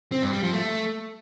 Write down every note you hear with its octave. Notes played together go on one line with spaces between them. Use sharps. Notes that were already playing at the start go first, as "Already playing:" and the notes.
C4
G2
G3
F3
A3